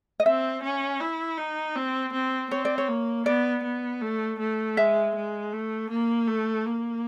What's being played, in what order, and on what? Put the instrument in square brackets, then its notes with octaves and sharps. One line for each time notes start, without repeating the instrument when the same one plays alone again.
[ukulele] D#5
[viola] C4 [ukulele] E5
[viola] C#4
E4
D#4
C4
C4
[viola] C4 [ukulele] C#5
[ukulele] D5
C#5
[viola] A#3
[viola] B3 [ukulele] D5
[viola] B3
A3
A3
[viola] G#3 [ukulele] E5
[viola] G#3
A3
A#3
A3
A#3